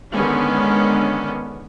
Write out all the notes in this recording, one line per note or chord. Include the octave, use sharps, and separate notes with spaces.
D3 D#3 G#3 B3 C#4 D4